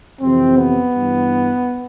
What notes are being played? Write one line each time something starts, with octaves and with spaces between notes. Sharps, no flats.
F2 C3 E3 C4
B3
G2 E3